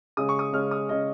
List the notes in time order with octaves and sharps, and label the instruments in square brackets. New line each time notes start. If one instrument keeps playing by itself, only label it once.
[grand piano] C#3 G#3 C#4 D#6
C#6
D#6
C#3 G#3 C#4 F6
D#6
C#3 G#3 C#4 D#5